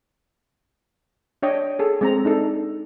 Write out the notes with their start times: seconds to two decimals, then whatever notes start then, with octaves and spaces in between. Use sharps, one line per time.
1.43 D4 C#5 D#5 G5
1.79 G#4 A4
2.01 G#3 C4 A#5
2.25 D4 D#4 A4